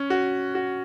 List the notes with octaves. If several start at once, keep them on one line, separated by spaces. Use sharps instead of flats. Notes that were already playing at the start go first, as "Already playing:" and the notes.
Already playing: C#4
F#4
F#4